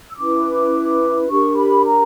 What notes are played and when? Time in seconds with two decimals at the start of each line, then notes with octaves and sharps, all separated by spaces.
0.10 E6
0.17 C#4 E4 B4 D6
1.28 D4 G4 A#4 C#6
1.56 B5
1.84 A#5